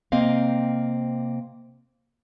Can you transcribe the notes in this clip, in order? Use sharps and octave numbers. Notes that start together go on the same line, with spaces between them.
C3 A#3 C4 D#5 F5